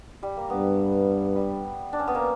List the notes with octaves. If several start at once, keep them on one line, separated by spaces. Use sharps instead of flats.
G3
A#3
G2 B3
G3
D4
C#4
B3
A#3